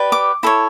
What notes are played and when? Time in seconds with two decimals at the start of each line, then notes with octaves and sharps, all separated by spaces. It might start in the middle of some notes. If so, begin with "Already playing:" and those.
Already playing: G4 B4 D5
0.12 D6
0.43 E4 A4 C#5